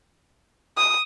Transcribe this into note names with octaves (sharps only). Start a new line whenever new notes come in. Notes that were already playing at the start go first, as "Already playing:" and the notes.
D#6